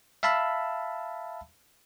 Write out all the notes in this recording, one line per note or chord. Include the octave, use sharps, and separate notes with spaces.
E5 F5 A5 B5 E6